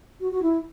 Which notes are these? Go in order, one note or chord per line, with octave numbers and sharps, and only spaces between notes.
F#4
F#4
E4